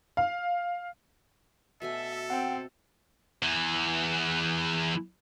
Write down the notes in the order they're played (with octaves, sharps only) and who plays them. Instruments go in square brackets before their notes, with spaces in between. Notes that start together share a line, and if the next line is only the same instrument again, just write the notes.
[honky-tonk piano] F5
[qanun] B2 A3 G#5 [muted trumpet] A4 [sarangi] E5
[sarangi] C4 [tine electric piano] F#5 G5
[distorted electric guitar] E2 E3